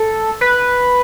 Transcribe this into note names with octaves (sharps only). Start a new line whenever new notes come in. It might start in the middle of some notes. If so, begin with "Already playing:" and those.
Already playing: A4
B4